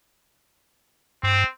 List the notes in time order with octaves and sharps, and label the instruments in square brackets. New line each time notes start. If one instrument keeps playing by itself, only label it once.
[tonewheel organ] G2 [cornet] C4